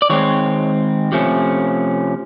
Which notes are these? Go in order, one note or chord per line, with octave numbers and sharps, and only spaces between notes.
D5
D#3 G#3 C4 C#5
C3 F3 A3 C#4